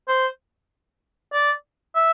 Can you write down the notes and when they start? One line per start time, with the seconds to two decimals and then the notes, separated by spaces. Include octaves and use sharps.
0.08 C5
1.33 D5
1.95 E5